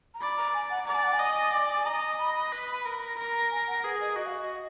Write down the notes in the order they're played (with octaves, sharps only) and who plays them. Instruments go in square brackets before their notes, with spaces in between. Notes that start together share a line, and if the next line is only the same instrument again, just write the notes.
[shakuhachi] A#5
[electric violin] D5 [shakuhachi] B5
[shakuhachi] A#5
G#5
F#5
[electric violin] D5 [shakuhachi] A#5
[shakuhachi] G#5
F#5
G#5
[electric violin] D#5
D5
[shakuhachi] G#5
[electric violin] D#5 [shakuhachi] A#5
[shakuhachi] B5
B5
[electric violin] B4
A#4
[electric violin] A#4 [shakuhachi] A#5
[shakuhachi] G#5
F#5
[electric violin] G#4 [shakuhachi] B4
[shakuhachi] D#5
[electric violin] F#4 [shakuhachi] D#5
[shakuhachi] F5
D#5